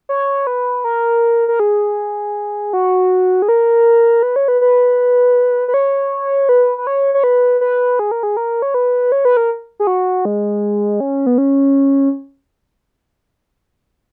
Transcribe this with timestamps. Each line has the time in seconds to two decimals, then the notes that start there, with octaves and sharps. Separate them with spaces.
0.09 C#5
0.47 B4
0.84 A#4
1.48 A#4
1.60 G#4
2.73 F#4
3.42 G#4
3.49 A#4
4.23 B4
4.36 C#5
4.48 B4
4.61 B4
5.68 B4
5.74 C#5
6.49 B4
6.78 B4
6.87 C#5
7.14 C#5
7.24 B4
7.61 B4
7.99 G#4
8.11 A#4
8.23 G#4
8.37 A#4
8.62 C#5
8.74 B4
9.12 C#5
9.25 B4
9.37 A#4
9.80 G#4
9.87 F#4
10.25 G#3
11.00 C#4
11.26 B3
11.38 C#4